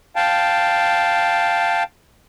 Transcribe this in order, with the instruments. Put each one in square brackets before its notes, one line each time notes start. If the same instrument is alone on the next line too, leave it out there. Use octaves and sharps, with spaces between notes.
[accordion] F5 G5 A5